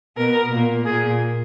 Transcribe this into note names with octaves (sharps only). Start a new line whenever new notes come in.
B2 B3 A#4
A#2 A#3
A#2 A#3 G#4